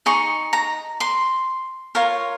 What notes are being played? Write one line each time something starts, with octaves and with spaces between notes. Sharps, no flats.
D#4 G#4 D#5 C#6
A#5
C6
F4 A#4 C#5